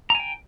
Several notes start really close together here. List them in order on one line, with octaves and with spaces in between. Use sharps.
A#5 G#5 G5